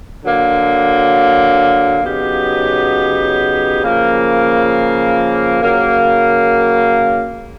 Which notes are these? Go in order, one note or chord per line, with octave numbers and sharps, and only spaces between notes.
D3 F#3 A#3
C#3 F#3 B3 D#4 G4
C#3 F3 A#3
C#3 F#3 A#3